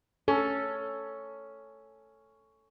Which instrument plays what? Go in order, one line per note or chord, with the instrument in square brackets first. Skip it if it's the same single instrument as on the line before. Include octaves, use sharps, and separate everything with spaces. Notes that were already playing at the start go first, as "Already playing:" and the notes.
[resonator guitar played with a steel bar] C#4 [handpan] A4